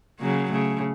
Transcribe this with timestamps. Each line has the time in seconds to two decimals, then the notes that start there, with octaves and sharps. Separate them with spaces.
0.19 C#3 F#3 A#3
0.49 C#3 A3